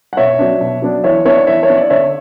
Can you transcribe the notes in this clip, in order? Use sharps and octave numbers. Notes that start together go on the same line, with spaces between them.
F#5
B2 C#5 E5
F#3 B3 D4
B2
F#3 B3 D4
E3 C#5 E5
B3 D4 C#5 E5
E3 C#5 E5
C#5
B3 D4
D5
D3 C#5 E5